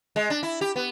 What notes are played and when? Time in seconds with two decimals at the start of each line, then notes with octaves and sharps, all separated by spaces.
0.16 G#3
0.30 D4
0.43 E4
0.61 G4
0.76 B3